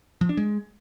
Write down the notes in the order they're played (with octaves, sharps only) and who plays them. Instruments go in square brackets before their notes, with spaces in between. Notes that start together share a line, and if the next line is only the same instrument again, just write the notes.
[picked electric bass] F3
D4
G#3